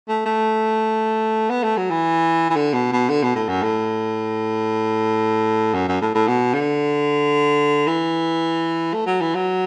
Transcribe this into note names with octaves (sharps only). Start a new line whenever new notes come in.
A3
A3
B3
A3
F#3
E3
E3
D3
B2
B2
D3
B2
A2
F#2
A2
F#2
F#2
A2
A2
B2
D3
E3
A3
F#3
E3
F#3